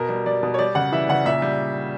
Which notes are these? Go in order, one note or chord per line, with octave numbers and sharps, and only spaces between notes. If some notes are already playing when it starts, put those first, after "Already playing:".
Already playing: B2 A#4
G3
G3 D5
B2
C#5
G3 D5
C#3 F#5
E3 E5
C#3 F#5
A#2 E5
G3